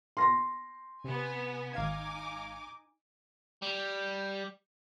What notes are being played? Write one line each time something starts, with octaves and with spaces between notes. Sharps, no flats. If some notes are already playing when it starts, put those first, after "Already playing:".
C6 A#6
C3 B3 G#5
G#1 D#4 F5 G#5 D6 G#6
G3